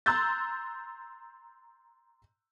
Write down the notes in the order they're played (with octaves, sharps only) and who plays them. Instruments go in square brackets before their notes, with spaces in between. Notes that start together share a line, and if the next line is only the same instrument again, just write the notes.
[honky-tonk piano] A#5 C6 E6 F#6 G6 A6